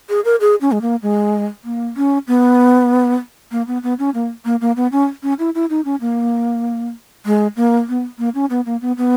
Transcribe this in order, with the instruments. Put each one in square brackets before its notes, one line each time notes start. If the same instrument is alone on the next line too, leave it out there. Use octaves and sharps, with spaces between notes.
[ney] G#4
A#4
G#4
C#4
G#3
A#3
G#3
A#3
C#4
B3
A#3
B3
B3
C#4
A#3
A#3
A#3
B3
C#4
C#4
E4
E4
D#4
C#4
A#3
G#3
A#3
B3
A#3
C#4
B3
A#3
B3
B3